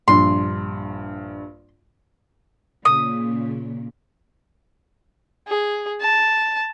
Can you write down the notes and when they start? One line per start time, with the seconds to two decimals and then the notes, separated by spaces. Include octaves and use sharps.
0.08 A#1 G2 C6
2.85 A#2 C#3 D#6
5.47 G#4
6.01 A5